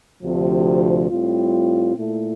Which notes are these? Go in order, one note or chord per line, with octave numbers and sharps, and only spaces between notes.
D2 C3 F3
A2 G3 C4 F4
A#2 A3 E4